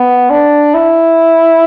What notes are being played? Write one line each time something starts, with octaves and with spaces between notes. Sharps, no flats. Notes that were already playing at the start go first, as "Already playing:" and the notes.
Already playing: B3
D4
E4